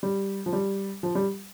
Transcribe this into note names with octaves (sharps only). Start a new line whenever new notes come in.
G3
F3
G3
F3
G3